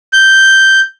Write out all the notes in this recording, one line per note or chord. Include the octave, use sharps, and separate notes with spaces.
G6